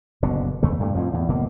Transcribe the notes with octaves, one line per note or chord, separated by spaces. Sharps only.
F#1 B2 D3
E2 C#3 A3
G2 A#2 G#3 A3
F2 A2 F3
E2 A2
G1 B2 A#3